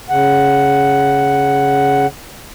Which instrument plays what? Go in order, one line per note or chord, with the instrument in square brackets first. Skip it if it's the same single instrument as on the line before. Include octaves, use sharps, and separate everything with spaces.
[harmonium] C#3 F#5